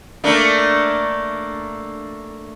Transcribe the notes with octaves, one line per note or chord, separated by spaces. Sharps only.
A3 A#3 D4